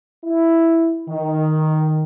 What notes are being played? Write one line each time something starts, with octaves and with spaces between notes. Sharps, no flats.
E4
D#3